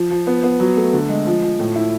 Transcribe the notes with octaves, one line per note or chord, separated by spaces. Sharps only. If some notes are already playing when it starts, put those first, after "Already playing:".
Already playing: F3
F3
B3
B3
F#3
A3
D3
G#3
F3
F3
A2
E4